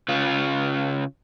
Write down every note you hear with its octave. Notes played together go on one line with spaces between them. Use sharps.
C#3 F4